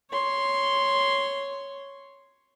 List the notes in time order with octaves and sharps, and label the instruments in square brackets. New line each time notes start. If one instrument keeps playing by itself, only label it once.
[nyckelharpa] C#5 C6